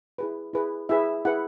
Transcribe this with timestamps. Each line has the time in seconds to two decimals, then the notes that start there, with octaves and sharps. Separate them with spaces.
0.18 E4 G#4 B4
0.54 E4 G#4 B4
0.89 E4 G#4 B4 E5
1.25 E4 G#4 B4 F#5